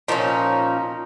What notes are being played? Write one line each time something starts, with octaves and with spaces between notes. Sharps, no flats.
A#2 F3 A#3 C#4 D#4